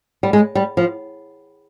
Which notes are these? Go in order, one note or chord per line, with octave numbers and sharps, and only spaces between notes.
G3
G#3
G3
F3